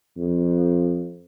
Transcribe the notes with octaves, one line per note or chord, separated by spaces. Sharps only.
F2